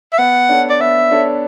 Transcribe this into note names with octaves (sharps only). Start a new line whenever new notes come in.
E5
B3 F#5
D4 A4 C#5
D5
B3 E5
D4 A4 C#5